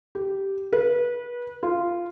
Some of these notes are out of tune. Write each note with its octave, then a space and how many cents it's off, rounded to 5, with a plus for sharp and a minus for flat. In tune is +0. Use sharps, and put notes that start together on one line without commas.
G4 -5
B4 -25
F4 -10